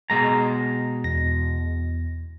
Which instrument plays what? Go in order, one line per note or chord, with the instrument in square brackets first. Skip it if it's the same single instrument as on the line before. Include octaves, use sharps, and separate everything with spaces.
[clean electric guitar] B2 G#3 A#5
[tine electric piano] E2 A#6